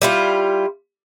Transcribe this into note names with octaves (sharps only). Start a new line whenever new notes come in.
G3 E4 F4